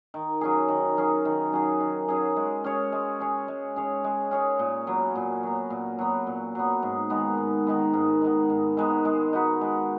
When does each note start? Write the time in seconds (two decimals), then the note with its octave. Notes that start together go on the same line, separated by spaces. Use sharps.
0.14 D#3
0.41 F#3 C#4 G#4
0.68 D#3
0.97 F#3 C#4 G#4
1.25 D#3
1.53 F#3 C#4 G#4
1.80 D#3
2.08 F#3 C#4 G#4
2.36 G#3
2.64 C#4 G#4 C#5
2.92 G#3
3.20 C#4 G#4 C#5
3.48 G#3
3.76 C#4 G#4 C#5
4.04 G#3
4.31 C#4 G#4 C#5
4.59 A#2
4.87 F#3 B3
5.15 A#2
5.43 F#3 B3
5.70 A#2
5.99 F#3 B3
6.27 A#2
6.55 F#3 B3
6.83 G#2
7.10 D#3 G#3 B3
7.37 G#2
7.67 D#3 G#3 B3
7.93 G#2
8.22 D#3 G#3 B3
8.50 G#2
8.77 D#3 G#3 B3
9.05 G#3
9.33 D#4 F#4 B4
9.61 G#3